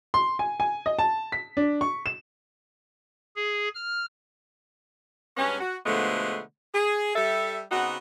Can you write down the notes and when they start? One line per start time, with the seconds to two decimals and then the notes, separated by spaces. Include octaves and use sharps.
0.14 C6
0.39 G#5
0.60 G#5
0.86 D#5
0.99 A5
1.32 B6
1.57 D4
1.81 C#6
2.06 E7
3.36 G#4
3.75 F6
5.37 G2 G#3 B3 C#4
5.61 F#4
5.86 B2 D3 F3 G#3 A3 B3
6.75 G#4
7.16 G3 A4 E5
7.72 C#3 B3 C4 D#4 F#4